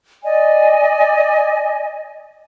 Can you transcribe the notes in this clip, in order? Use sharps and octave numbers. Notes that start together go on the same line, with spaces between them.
D5 D#5 G#5